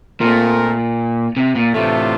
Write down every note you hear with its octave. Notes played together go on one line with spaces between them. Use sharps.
A#2 A3 C4 F4 A#4
C3
A#2
A2 C3 E3 A3 D4 F4